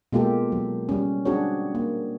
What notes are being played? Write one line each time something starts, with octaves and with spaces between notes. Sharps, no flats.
B2 G#3 A#3 F4 G4 A4
F#3
G3 C#4
C4 D4 F#4 G#4 C#5
A#3